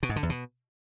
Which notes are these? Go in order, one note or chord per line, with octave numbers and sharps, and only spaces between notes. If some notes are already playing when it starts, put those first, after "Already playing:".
B2
G#2
D3
E2
B2